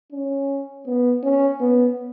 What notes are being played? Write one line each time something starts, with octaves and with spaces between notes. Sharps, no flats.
C#4
B3
C#4
B3